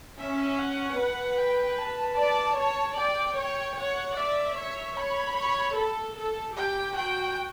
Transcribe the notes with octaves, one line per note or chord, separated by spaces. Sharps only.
C#4 E5
F#5
B4
G5
A5
D5
C#5
D5 G5
C#5
C#5 F#5
D5 E5
C#5
C#5 B5
C#5
A4
A4
G4 G5
F#4 G5